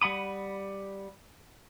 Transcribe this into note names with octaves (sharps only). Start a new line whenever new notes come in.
G3 F#5 B5 D#6